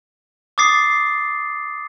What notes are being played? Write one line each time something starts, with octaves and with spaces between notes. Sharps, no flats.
D6 D#6 A6 C7